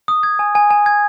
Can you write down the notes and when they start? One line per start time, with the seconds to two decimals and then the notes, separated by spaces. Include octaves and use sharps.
0.08 D#6
0.23 G#6
0.39 G#5
0.55 G#5
0.70 G#5
0.86 G#6